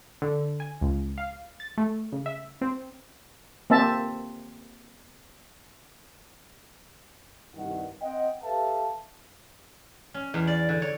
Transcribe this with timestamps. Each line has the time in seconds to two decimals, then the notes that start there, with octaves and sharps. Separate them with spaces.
0.22 D3
0.60 G#5
0.81 C#2
1.18 F5
1.60 A6
1.78 A3
2.12 C#3
2.26 E5
2.61 C4
3.70 A#3 C4 E5 A5
7.55 C2 G2 D#3 F#5
8.03 C4 D#5 F#5 G5
8.44 G4 A4 B4 E5 F5 A5
10.14 C#4
10.34 E2
10.47 D5
10.69 D3
10.82 C#5